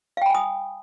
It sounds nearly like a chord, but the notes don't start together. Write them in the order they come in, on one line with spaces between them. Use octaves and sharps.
F5 G5 B5 G#5 D#6